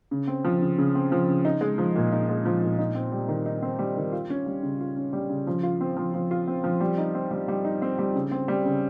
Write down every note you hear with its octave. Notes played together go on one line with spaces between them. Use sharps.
C#3
C4
F3
C#3
C#3
C4
F3
C#3
D#4
G#3
F3
A#2
D#4
G#3
F3
A#2
D#4
C4
G3
D#3
D#4
C4
G3
D#3
F4
C#4
G3
C#3
F4
C#4
G3
C#3
F3
F4
C4
F3
F3
F4
C4
F3
G3
D#4
C4
G3
G3
D#4
C4
G3
C#3
C4
G3
C#3